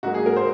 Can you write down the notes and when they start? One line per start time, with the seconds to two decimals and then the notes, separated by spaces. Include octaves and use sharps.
0.03 G#2 F#3 A#3 F#4
0.14 G#4
0.26 A#4
0.37 C5